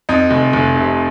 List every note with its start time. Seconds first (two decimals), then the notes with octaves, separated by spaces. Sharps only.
0.09 F2 D#4
0.31 F1
0.53 F1
0.76 C3